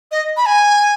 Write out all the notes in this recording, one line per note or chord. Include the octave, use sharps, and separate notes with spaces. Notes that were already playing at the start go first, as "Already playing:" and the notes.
D#5
B5
G#5